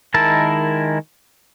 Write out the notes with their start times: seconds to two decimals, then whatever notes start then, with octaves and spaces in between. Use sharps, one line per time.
0.14 D#3 G#3 E4 A#4 A5